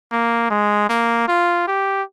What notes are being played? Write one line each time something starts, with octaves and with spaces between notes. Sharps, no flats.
A#3
G#3
A#3
F4
G4